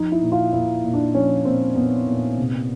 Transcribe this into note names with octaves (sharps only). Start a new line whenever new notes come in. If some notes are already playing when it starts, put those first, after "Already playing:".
Already playing: F3 D#4
E4
A#2
F4
A#2 E4
A#2
D4
F3 C#4
A#2 C4
A#2 B3
A#2
C3